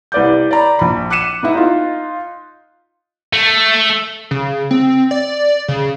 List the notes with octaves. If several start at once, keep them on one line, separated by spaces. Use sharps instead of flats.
C2 B4 D5 D6 G6
D5 A#5 B5
A#1 B5
D6 F#6 B6 C#7 D#7 E7
B3 D#4 E4
D#4 F4
A3
C#3
C4
D5
C#3